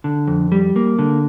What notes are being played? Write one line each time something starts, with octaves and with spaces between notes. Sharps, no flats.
D3
F2
G3
A#3
D3